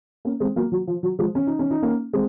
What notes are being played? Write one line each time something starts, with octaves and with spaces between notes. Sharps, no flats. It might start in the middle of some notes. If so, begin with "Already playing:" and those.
A#3 C#4
G#3 C4
F#3 A#3
F#3
F3
F#3
F3 G#3
C#4
D#4
C#4
D#4
A#3 C#4
G#3 C4